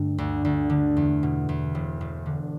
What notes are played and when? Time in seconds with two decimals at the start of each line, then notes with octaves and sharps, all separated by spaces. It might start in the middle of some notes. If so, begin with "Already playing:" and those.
Already playing: G2 D3 A3
0.18 D2
0.45 D2
0.70 D3
0.97 E2
1.23 B2
1.49 E2
1.75 E1
2.01 E1
2.26 D3